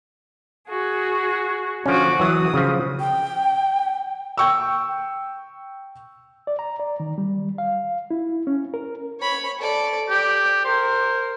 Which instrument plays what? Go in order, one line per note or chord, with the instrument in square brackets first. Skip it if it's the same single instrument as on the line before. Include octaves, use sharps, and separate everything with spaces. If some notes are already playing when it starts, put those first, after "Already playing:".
[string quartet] F#4 G#4
[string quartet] D3 F#4 D6 [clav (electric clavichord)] F3 C#4
[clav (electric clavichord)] E3 F#3 [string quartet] D#6
[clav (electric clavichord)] C#3 F3
[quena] G5
[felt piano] G5 C#6 E6
[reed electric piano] D5
A#5
D5
D#3
G3
F5
E4
C#4
A#4
[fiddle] C#5 B5
A4 D5
[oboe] G4 [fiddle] D5
[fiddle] A#4 [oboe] C5